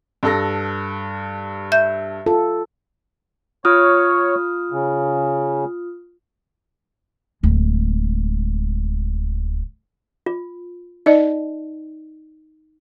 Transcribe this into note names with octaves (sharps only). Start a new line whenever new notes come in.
G2 A4 A#6
E5 G6
F4 A4
F4 C#5 D#6 F6
C#3
D1 G#3
F4
D#4 D5 D#5